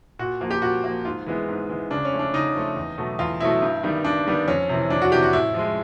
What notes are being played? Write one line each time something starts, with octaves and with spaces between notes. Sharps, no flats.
A#2 F#4
F3 A#3
G4
A#2 F#4
F3 A#3
G#2 F4
E3 G#3 B3
G#2
E3 G#3 B3
C#3 D4
C#4
F3 A3
D4
C#3 D#4
F3 A3
E2
B2 F#3 A3
E2 F4
B2 F#3 A3 E4
G2
D#3 G3 B3
G2 D4
D#3 G3 B3
F2 C#4
C3 E3
F2 D4
F#4
C3 E3 G4
F#4
A2 E4
F3 G#3